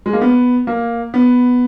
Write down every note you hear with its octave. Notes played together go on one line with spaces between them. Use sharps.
G#3
A#3
B3
A#3
B3